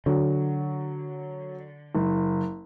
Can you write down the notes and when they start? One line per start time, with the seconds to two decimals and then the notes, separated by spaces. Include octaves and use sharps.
0.06 D3 F#3
1.95 F#1